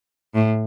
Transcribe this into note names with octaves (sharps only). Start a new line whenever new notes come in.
A2